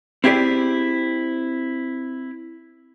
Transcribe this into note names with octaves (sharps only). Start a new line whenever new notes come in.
C4 E4 G4 G#4 D5